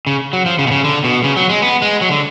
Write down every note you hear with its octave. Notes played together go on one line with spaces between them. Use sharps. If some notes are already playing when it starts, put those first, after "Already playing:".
C#3
F#3
F3
C#3
B2
C#3
D3
B2
C#3
F#3
G#3
B3
G#3
F#3
D3